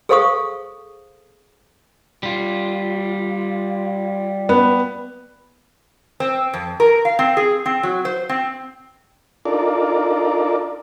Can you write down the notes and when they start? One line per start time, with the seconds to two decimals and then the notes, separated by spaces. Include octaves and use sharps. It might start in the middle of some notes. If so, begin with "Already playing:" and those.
0.09 G#4 A4 C5 F5 C#6 D#6
2.23 G3 F4
4.49 B3
6.20 C4
6.54 F2
6.80 A#4
7.05 F5
7.19 C4
7.37 G#4
7.66 C4
7.83 F#3
8.05 C5
8.29 C4
9.45 D4 D#4 F4 A4 A#4 D5